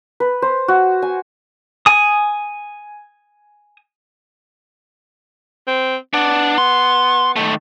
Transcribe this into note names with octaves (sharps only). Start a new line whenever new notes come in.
B4
C5
F#4
G#5
G#5 D#6
C4
B3 D4
C6
D#3 A3